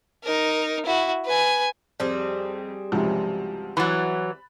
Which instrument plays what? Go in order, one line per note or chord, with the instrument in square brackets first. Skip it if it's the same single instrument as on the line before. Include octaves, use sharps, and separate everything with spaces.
[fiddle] D#4 A#4
E4 F#4
B4 G#5
[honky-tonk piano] F2 [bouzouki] G3 C4 G#4
[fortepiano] C#2 G#2 C3 [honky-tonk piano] F3 F#3
[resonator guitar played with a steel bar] E3 F#3 [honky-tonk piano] B5 F#6 A6